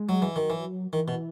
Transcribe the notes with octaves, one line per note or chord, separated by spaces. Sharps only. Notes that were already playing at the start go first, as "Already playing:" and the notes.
Already playing: G#3
F#3
E3
D#3 F#3
E3
D#3 E3
B2